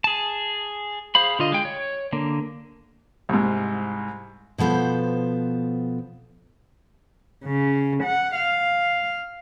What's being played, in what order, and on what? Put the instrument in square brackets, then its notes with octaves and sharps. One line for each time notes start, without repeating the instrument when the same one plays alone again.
[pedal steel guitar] G#4 A5
G#4 C5 F5 B5
D3 F4 D#5
G#3 G5
C#5
D3 A#3
[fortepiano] C2 G#2
[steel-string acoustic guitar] B2 F3 B3 A4 C5
[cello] C#3
F#5
F5